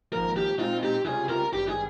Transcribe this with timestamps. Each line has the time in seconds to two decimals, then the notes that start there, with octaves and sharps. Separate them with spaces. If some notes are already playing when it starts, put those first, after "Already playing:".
0.13 G#1 G#2 F3 A#3 A#4
0.36 G4
0.59 A#2 G#3 C4 D#4 F4
0.83 G4
1.06 C#2 C3 G3 C#4 F4 G#4
1.29 A#4
1.53 G#1 G2 G3 G4
1.68 G#4